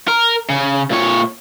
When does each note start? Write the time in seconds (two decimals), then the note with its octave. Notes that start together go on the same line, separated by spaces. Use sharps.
0.08 A#4
0.50 C#3
0.91 A#2 C#5